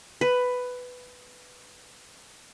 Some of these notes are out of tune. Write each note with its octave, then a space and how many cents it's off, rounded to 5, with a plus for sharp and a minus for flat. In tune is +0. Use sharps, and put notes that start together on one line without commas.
B4 +10